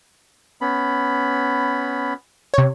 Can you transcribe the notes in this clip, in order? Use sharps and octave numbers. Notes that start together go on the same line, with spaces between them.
B3 C#4 B5
C3 C#5